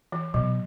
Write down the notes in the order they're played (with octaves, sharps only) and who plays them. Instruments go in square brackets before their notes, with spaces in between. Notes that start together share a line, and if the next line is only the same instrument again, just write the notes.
[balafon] E3
[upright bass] B2 [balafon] F#3